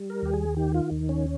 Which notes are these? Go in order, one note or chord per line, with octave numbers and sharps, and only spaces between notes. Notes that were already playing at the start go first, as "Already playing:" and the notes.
Already playing: G3
A#4
D#2 G4
G#4
D#3 G4
F4
D#2
C#4